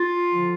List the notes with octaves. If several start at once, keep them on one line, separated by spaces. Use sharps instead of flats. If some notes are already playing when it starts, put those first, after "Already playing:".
Already playing: F4
D3 F3